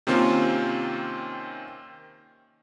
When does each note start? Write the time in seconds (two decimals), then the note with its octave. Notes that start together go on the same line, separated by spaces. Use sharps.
0.07 C3 D#3 A#3 C4 C#4 F4